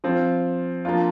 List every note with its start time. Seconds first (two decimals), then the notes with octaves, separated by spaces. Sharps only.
0.04 F3 C4 F4
0.85 F3 A#3 D4 F4